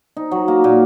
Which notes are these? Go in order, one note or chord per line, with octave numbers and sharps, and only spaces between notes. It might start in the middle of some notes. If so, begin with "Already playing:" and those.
D#4
F#3
A#3
A#2